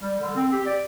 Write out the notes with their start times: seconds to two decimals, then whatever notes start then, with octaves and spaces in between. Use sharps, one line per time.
0.01 G3
0.20 D3
0.36 C4
0.51 G4
0.66 D5